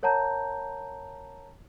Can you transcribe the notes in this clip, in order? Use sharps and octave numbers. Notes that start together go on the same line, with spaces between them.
A#4 C#5 F#5 A5 A#5 G6